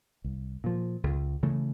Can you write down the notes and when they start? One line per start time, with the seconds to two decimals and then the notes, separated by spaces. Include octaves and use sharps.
0.24 C2
0.64 A#2 F3
1.03 C#2
1.43 C#3 E3 A3